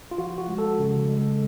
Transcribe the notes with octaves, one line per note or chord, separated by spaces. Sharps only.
F4
F3 F#4
F#4
G#3
A4
C#3
G#3